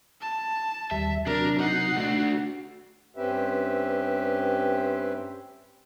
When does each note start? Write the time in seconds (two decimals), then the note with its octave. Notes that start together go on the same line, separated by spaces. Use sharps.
0.21 A5
0.91 D#2 G3 E5
1.26 C3 F#3 D4 A#4
1.59 D#4 F#5 C7
1.96 A3 D4 F#4
3.16 G2 C4 C#4 G4 B4 E5